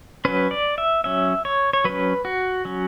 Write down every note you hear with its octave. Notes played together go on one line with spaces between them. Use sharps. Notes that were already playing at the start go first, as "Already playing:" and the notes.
F#3 C#4 B4
D5
E5
F#3 C#4 E5
C#5
C#5
F#3 C#4 B4
F#4
F#3 C#4